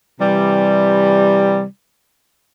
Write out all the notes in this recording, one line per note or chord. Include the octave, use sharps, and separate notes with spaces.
C3 E3 G3